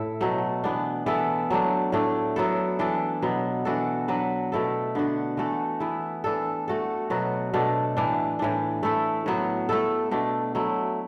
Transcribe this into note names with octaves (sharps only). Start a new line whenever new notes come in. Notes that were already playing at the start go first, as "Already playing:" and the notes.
Already playing: A2 E4 A4
B2 F#3 A3
E3 B3 D4
E3 B3 E4 A4
F#3 A3 D4
A2 A3 D4
F#3 B3 E4 A4
E3 D4 A4
B2 F#3 B3
E3 D4 F#4 A4
F#3 D4 F#4 B4
B2 A3 E4 A4
D3 B3 D4 F#4
E3 A3 F#4 A4
E3 B3 E4
E3 D4 A4
A3 F#4 A4
B2 F#3 B3 F#4
B2 A3 D4 A4
A2 E3 D4
A2 E3 D4
A3 E4 A4
A2 F#3 B3
A3 E4 A4
B2 A3 D4
F#3 A3 E4